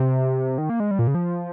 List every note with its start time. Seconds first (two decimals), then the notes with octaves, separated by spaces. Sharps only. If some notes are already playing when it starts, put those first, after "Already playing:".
Already playing: C3
0.58 D#3
0.70 A#3
0.80 G#3
0.91 G3
0.99 A#2
1.07 C#3
1.15 F3